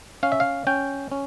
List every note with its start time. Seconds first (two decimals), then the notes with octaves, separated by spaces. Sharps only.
0.23 C#4 F5
0.32 E5
0.40 F5
0.67 C#4 G5
1.12 C#4